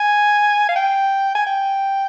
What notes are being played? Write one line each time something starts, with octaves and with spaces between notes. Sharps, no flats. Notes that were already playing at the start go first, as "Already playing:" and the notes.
Already playing: G#5
F5
G5
G#5
G5